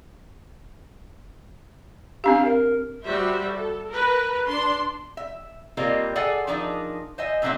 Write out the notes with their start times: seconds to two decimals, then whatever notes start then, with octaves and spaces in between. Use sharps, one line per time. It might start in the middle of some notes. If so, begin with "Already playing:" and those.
2.24 C4 D4 G4 F5
2.45 A#4
3.04 G3 F#4 C5 E5
3.50 A4
3.89 A#4 B4
4.47 D4 C6
5.17 E5
5.77 G3 A#3 C4 F4 A#4 D#5
6.15 G#4 A4 D5 E5 F#5 G#5
6.47 F3 D4 D#4 G#4 A#4 E5
7.18 C5 D#5 E5 G#5
7.42 A#2 D3 F#3 C4 D#5 E5